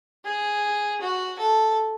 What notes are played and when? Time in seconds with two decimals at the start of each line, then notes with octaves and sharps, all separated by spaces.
0.25 G#4
1.01 F#4
1.39 A4